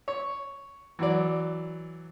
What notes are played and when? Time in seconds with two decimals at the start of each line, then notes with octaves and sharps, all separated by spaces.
0.08 C#5
0.99 E3 F#3 D5